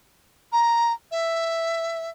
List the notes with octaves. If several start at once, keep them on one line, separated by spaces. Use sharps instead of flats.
A#5
E5